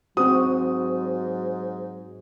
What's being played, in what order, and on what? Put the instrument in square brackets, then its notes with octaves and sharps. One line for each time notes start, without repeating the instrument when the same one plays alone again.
[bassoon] G#2 [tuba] F#3 [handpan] C4 F#4 [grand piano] D#6